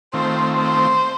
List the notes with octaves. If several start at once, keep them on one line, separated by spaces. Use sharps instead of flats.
D#3 A3 C4 F4 C5
C5